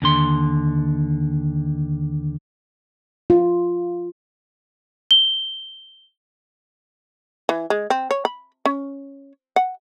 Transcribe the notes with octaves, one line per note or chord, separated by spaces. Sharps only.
D#2 D3 C6
F4
G7
E3
G#3
C4
C#5
B5
C#4
F#5